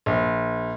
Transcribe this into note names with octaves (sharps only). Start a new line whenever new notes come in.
A#1